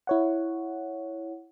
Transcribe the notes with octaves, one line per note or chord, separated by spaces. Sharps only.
E4 C#5 F#5